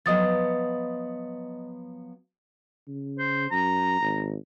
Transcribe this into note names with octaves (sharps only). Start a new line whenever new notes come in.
F3 F#3 B3 D#5 D#6 A6
C#3
C5
F#2 A#5
G#1